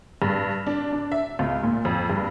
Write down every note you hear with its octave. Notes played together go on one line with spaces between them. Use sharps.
G2
D4
D4
E5
C#2
A#2
F2
G2